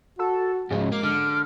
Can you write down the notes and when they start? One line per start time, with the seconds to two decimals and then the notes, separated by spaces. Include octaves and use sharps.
0.19 F#4 A4
0.71 G#2 C#3 F3 G#3
0.92 A#3 D6
1.04 D3 F6